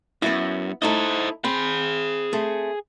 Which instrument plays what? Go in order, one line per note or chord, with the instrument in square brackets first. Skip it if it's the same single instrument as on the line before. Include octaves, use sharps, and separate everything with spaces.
[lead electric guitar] F#2 [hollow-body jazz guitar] B3 E4
[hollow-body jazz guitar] A3 D#4 E4 [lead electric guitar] C5 D#5
[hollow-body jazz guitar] C4 [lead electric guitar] G#4 B5
[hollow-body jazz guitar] A3 C4